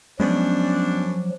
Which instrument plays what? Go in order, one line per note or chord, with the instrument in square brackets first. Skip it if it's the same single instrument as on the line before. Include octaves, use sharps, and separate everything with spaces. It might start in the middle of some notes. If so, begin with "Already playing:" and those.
[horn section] F#2 D4 [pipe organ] F3 F#3 [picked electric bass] G#3 B3 C#4